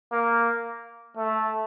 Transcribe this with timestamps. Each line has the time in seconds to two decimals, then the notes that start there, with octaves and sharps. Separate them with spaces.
0.12 A#3
1.17 A3